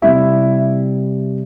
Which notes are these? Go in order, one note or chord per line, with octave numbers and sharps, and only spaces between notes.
C3 G3 C4 E4 E5